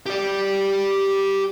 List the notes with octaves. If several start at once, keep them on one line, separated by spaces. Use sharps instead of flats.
G4 D5